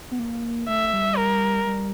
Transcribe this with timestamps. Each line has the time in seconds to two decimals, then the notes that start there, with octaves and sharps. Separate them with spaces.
0.11 B3
0.19 A#3
0.68 A3 E5
0.93 G3
1.17 A#4
1.66 G3